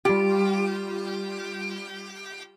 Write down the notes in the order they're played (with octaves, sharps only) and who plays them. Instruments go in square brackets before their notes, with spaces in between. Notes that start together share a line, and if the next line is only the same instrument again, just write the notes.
[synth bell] G3 F4 [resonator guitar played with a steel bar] G4